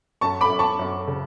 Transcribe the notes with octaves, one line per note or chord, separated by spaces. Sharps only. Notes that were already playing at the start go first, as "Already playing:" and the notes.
F#2 A5 C#6
B5 D6
F#2
A5 C#6
F#2
C#3